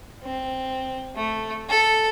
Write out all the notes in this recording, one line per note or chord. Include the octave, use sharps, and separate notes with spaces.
C4
A3
A4